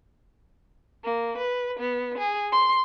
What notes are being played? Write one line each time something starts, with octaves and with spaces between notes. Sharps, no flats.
A#3
B4
B3
G#4
C6